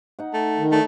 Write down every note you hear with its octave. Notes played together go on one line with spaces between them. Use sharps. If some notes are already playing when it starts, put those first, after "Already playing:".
D#4 F#5
A3
D#3
A3 D#4 D5